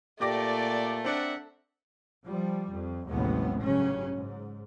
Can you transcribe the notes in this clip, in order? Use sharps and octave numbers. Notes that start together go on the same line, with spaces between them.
A#2 A3 G4 D5 D6 A#6
C4 D4 A#4 E5 F#5
F3 G3
F2
A1 D#2 C3 F#3 G#3 B3
G2 C#3 F#3 C#4
G#2